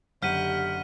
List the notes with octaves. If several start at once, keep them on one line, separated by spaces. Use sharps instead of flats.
F#1 D3 G4 F#5 F6 B6 D#7